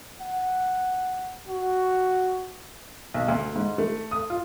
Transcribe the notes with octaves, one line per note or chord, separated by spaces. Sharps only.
F#5
F#4
B1
D2
G#2
A3
D#6
F4